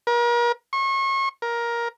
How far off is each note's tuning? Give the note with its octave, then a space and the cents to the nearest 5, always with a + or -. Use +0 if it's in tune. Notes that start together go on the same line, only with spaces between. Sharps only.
A#4 +40
C#6 -35
A#4 +15